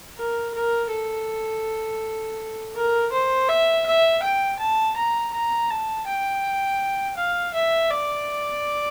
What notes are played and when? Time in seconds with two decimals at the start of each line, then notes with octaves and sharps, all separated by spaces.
0.18 A#4
0.54 A#4
0.91 A4
2.75 A#4
3.12 C5
3.49 E5
3.86 E5
4.23 G5
4.59 A5
4.96 A#5
5.33 A#5
5.70 A5
6.07 G5
7.17 F5
7.54 E5
7.91 D5